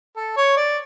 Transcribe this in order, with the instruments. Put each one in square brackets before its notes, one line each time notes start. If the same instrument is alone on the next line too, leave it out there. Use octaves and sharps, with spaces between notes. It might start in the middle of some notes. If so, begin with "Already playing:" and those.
[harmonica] A4
C#5
D5